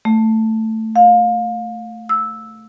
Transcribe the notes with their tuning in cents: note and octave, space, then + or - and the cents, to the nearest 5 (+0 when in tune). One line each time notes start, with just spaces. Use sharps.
A3 +10
F5 +25
E6 -10